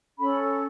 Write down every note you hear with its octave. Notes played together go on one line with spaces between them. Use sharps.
C#4 A4 B5